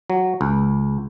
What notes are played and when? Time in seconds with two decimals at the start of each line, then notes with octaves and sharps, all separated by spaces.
0.10 F#3
0.41 C#2